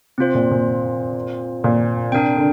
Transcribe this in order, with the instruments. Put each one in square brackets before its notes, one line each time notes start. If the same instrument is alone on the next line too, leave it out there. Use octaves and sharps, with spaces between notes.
[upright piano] C3 [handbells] C4 F4 C5
[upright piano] A#2
A#2
A#2
[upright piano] C3 [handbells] D4 A#4 G5
[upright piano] D3